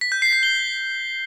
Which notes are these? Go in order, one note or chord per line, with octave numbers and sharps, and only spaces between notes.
B6
G6
C7
B6
G7